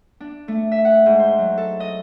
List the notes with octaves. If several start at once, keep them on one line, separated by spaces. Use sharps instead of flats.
D4
A3
E5
F#5
G#2
C5
F#3
A4
D#5